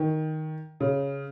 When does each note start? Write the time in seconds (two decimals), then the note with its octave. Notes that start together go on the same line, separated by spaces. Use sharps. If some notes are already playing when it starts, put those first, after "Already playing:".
Already playing: D#3
0.80 C#3